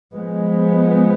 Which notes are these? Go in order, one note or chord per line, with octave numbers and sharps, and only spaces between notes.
F3 G#3 B3